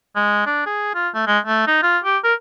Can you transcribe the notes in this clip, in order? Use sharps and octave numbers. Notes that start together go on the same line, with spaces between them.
G#3
D4
G#4
F4
A3
G#3
A3
D#4
F4
G4
A#4